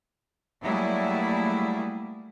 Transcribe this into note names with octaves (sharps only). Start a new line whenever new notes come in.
F#3 G3 A3 A#3 E4 G#4